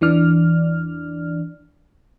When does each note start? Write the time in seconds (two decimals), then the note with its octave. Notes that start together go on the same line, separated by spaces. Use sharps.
0.01 E2 E3 D4 D5 F6